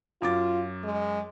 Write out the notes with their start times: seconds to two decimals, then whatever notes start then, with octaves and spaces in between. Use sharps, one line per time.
0.22 F#2 F4 D6 A6
0.84 G#3